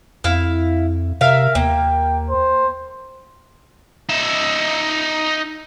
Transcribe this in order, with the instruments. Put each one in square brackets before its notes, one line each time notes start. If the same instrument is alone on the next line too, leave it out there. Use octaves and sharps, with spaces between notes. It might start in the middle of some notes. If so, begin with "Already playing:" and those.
[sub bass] F2 [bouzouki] E4 E5 F5
[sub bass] C3 [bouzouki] A#4 E5 F5
[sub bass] D#2 [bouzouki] A#3 [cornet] G5
[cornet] C5
[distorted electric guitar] D#4 E5